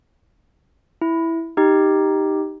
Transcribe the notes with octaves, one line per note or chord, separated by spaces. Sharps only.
E4
D#4 G4